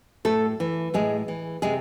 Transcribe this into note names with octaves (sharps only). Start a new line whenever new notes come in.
A2 A3 A4
E3
A2 G#3 G#4
E3
C3 G#3 G#4